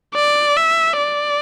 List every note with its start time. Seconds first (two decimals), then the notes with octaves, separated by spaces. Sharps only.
0.15 D5
0.57 E5
0.98 D5